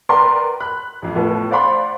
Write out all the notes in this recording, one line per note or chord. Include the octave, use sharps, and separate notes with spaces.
A#4 B4 D5 F#5 G5 C6
B5 F#6
A1 F2
A2 F3 A3 B3
C5 D5 F5 F#5 B5 C6